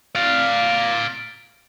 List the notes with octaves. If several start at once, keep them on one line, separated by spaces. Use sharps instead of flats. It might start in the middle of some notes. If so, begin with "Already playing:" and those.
D5 F5